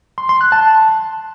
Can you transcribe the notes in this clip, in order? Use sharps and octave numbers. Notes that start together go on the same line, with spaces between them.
C6
C6
F#6
A5